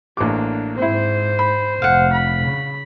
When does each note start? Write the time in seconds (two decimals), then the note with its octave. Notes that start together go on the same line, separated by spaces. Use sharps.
0.17 A1 A#3 D4 D6
0.77 G#2 C4 E4 C5
1.39 B5
1.82 F1 F5 F#5
2.13 B5
2.45 C#3